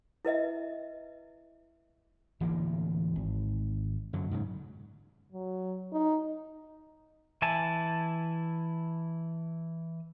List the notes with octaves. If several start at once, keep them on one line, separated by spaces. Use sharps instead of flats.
E4 B4 D#5 E5
D1 D2 E3 A#3
G#1
F#2 D3 F#3
G#2 C#3
F#3
D#4
E3 E4 G#5 A5